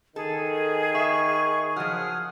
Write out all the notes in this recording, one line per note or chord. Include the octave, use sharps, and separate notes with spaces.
D#3 G#4 A4
E5 C#6
F3 F#3 F#5 D#6 F6